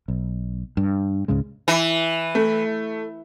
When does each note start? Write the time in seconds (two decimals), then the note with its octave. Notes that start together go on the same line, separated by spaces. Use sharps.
0.08 B1
0.77 G2
1.28 C#2 G#2 C#3 G#3
1.68 E3
2.35 A3